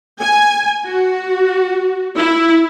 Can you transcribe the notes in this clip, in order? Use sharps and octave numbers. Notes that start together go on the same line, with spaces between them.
G#5
F#4
E4